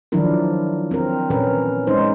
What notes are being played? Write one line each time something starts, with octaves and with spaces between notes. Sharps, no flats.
D#3 F3 F#3 D4 E4 A#4
C4 A#4
A#2 E3 C#4 A#4 B4
G#3 C#4 D#4 C5